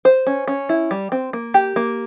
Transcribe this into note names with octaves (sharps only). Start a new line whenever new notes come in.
C5
C#4
C#4
E4
G3
C4
A#3
G4
A#3